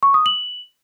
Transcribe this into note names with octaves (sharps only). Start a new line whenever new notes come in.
C#6
D#6
F#7